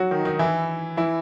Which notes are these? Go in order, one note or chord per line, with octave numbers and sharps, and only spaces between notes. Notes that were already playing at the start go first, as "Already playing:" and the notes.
Already playing: F#3 F#4
D#3 D#4
D#3 D#4
E3 E4
E3 E4